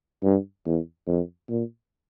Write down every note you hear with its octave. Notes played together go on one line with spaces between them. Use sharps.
G2
E2
F2
A#2